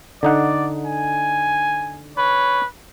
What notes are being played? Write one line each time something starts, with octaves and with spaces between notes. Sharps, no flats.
D3 D#4 D5 F#5
G#5
B4 C#5